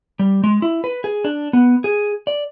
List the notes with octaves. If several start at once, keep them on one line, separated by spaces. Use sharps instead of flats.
G3
G#3
E4
B4
G#4
D4
B3
G#4
D5